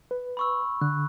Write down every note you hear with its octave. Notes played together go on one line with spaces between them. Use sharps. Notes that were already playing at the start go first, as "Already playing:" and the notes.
B4
B5 C#6 E6
D3 F#6